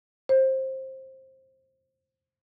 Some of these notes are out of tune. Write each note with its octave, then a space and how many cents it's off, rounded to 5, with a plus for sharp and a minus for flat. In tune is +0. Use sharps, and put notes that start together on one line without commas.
C5 +20